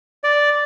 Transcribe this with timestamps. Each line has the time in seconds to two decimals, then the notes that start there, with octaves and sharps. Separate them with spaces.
0.24 D5